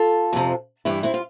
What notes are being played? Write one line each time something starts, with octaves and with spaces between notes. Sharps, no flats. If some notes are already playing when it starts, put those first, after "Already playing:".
Already playing: F4 A4
F2 C3 F3
G2 E3 E4 G4
C4 E4
F4